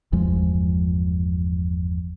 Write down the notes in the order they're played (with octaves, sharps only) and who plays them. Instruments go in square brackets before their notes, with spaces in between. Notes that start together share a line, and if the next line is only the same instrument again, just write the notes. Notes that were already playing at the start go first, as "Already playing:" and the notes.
[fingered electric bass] G1 E2 F3 G#3